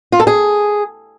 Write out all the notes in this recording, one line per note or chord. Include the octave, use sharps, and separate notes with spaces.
F4
A4
G#4